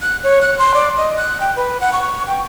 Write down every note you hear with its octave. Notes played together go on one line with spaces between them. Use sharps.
F#6
C#5
F#6
C6
D5
D#5
F#6
G5
B4
F#5
C#6
G5